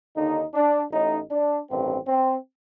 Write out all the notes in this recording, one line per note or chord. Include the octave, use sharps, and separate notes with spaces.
D#2 D3 D#4
D4
A1 A2 D#4
D4
A1 G2 D#3 C4
C4